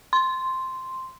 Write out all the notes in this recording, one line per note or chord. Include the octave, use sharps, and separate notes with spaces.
C6